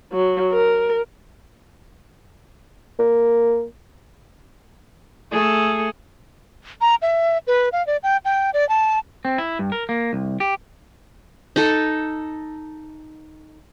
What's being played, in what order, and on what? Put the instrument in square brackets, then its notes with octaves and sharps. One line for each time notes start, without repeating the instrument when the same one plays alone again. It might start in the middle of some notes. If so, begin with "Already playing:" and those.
[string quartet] F#3
A#4
[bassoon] A#3
[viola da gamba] A3 G#4 A4
[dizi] A#5
E5
B4
F5
D5
G5
G5
D5
A5
[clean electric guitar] C4
E4
G2
A#4
A#3
C2
G4
[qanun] D#4 A4